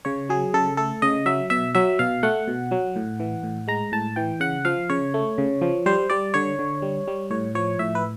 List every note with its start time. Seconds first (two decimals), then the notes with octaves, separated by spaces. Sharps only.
0.05 C#3 C#5
0.29 F#3 G#4
0.54 C#3 A4
0.77 A3 A4
1.02 C#3 D#5
1.26 F#3 E5
1.50 B2 E5
1.75 F#3 E5
1.99 B2 F5
2.23 A3 F#5
2.48 B2
2.71 F#3
2.96 A2
3.20 E3
3.43 A2
3.68 G#3 A#5
3.92 A2 A5
4.16 E3 G5
4.40 C#3 F#5
4.65 F3 F5
4.90 C#3 C#5
5.14 A3
5.38 C#3
5.61 F3
5.86 G3 C5
6.10 G3 D5
6.34 D3 C#5
6.59 D3
6.82 G3
7.07 G3
7.30 A2 C#5
7.55 F3 C#5
7.79 A2 E5
7.95 B4